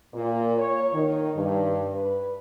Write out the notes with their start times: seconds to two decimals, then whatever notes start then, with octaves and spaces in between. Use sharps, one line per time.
0.14 A#2
0.59 C#5
0.93 D#3
1.36 G2
1.95 B4